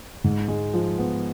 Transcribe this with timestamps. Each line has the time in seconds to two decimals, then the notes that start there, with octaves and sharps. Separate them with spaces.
0.24 G#2
0.48 G#3
0.74 F3
0.98 B3